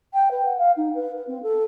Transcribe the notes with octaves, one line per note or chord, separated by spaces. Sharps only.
G5
B4
F#5
F5
D#4
B4
B4
C4
A4